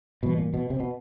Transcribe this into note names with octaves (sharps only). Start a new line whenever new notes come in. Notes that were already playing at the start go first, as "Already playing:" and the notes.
G#2 B2 E3 G3 A#3
A#2
B2
C3
B2